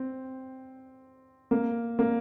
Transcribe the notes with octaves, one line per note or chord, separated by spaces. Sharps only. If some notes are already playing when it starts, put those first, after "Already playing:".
Already playing: C4
A#3
A#3